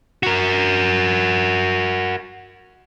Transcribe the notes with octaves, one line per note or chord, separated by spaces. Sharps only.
F#4 A#4